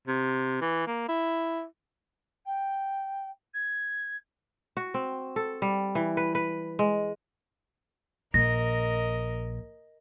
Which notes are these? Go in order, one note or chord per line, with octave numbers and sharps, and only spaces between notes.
C3
E3
A#3
E4
G5
G#6
F#4
C4
A4
G3
E3
B4
B4
G#3
A#1 A#4 D#5 A#6